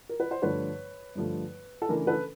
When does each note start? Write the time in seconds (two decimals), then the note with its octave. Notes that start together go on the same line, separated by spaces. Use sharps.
0.09 A#4
0.20 B4
0.31 C5
0.42 G2 D3 F3 A3 B4 C#5
1.15 G2 D3 F3 A3
1.82 A4
1.89 C#3 E3 A3 D4 A#4
2.07 A4 B4